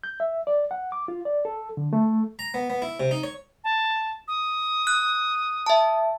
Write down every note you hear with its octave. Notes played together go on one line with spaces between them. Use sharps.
G6
E5
D5
F#5
D6
F4
D5
A4
D3
A3
A#5
B3
B3
E4
C3
D#4
C#5
A5
D#6
F#6
E5 A5